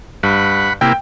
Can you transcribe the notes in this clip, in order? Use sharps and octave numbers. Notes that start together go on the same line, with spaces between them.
G2 F#5 B5
C3 A#3 E4 G5